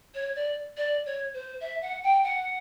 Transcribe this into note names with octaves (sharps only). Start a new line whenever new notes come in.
C#5
D5
D5
C#5
C5
E5
F#5
G5
F#5